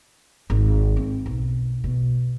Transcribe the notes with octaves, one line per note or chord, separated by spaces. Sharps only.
G#1
C4
B1
B2